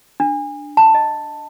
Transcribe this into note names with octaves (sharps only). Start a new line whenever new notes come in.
D4
A5
D#5